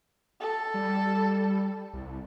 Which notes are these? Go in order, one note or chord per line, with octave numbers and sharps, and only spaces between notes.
A4
G3
C2